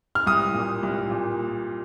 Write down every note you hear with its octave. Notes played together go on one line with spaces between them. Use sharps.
F6
C2 D#6
A#2
C2
A#2